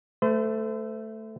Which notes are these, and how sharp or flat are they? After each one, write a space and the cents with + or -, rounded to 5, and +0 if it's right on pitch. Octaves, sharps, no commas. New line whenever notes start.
A3 +0 C5 -40